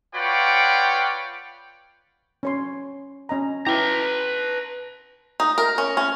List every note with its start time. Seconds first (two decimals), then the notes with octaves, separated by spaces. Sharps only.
0.15 F4 B4 C#5 D5 F#5 G5
2.43 C#4 C#5 C6
3.29 C#4 D#5 A#5
3.66 E4 B4 G5 A#5 D6
5.40 D#4
5.58 A#4
5.78 C#4
5.97 C#4